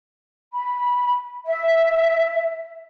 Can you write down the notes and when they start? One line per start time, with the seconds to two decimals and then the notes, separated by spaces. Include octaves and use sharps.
0.53 B5
1.46 E5